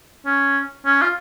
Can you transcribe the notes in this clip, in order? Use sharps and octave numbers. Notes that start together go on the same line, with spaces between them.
C#4
C#4
F4